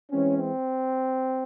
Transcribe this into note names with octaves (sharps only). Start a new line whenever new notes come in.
E3 G#3 C4 C#4
C4